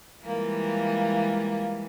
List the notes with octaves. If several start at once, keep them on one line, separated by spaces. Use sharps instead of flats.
E3 G3 G#3 A#3 F4